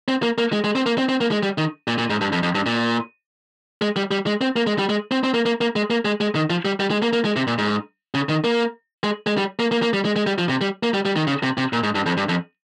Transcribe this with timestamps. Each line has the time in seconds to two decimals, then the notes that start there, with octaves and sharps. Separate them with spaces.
0.08 C4
0.23 A#3
0.38 A#3
0.53 G#3
0.64 G#3
0.75 C4
0.86 A#3
0.98 C4
1.09 C4
1.21 A#3
1.31 G#3
1.43 G3
1.58 D#3
1.88 A#2
1.98 A#2
2.10 G#2
2.21 G2
2.32 F2
2.43 F2
2.55 G2
2.66 A#2
3.82 G#3
3.96 G3
4.11 G3
4.26 G#3
4.41 C4
4.56 A#3
4.67 G#3
4.79 G3
4.89 G#3
5.11 C4
5.24 C4
5.34 A#3
5.46 A#3
5.61 A#3
5.76 G#3
5.90 A#3
6.05 G#3
6.21 G#3
6.35 D#3
6.50 F3
6.65 G3
6.80 G3
6.91 G#3
7.02 A#3
7.13 A#3
7.25 G#3
7.36 C3
7.47 A#2
7.58 G#2
8.14 C#3
8.29 D#3
8.44 A#3
9.03 G#3
9.27 G#3
9.38 G3
9.59 A#3
9.71 A#3
9.82 A#3
9.93 G3
10.05 G#3
10.16 G#3
10.27 G3
10.38 F3
10.49 C3
10.61 G3
10.83 A#3
10.94 G3
11.05 G3
11.16 D#3
11.27 C#3
11.43 C3
11.58 C3
11.73 A#2
11.83 G#2
11.95 G2
12.06 F2
12.17 G2
12.29 F2